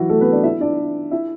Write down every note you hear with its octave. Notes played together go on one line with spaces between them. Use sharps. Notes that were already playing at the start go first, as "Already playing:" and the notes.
Already playing: E3 F#3 E4 F#4
A3 A4
B3 B4
D4 D5
E4 E5
D4 D5
E4 E5